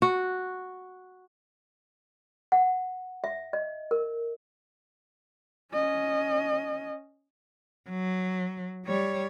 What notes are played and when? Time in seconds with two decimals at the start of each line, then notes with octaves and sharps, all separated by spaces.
0.02 F#4
2.52 F#5
3.24 E5
3.53 D#5
3.91 A#4
5.73 C#4 D#5
7.89 F#3
8.85 G3 C#5